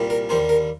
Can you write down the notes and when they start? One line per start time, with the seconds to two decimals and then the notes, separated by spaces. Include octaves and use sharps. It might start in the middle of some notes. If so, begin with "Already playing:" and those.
Already playing: C2 A#2 G3
0.10 A#4
0.29 D#2 D3 G3 A#3 C5
0.49 A#4